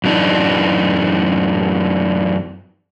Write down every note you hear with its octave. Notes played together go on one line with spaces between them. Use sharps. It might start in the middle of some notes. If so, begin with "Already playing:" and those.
F#2 E3 D4 D#4